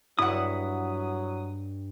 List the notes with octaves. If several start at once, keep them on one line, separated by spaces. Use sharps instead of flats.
G2 F#3 E4 F#5 D#6